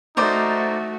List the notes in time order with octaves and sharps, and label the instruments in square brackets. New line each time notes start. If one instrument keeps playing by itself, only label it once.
[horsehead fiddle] A3 F#4 [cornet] D#4 [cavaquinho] A#4 C5 D5